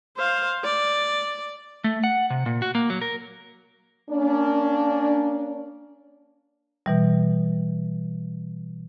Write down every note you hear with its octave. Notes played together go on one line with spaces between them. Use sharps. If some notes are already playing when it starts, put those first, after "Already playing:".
C5 F5
D5
A3
F#5
C3
A#2
F#4
A#3
F#3
A#4
A#3 C#4 D4
B2 E3 G3